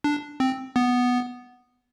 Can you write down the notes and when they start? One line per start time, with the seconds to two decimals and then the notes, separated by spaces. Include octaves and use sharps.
0.04 D4
0.40 C4
0.76 B3